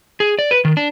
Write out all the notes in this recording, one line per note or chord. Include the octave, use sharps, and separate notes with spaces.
G#4
D5
B4
D#3
D4